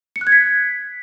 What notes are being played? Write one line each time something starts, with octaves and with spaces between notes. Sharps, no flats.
C#7
F#6
G#6
B6